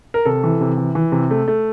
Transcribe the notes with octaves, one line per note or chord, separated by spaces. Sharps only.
A#4
C3 A4
E3
C3
E3
E3
C3
A3
A3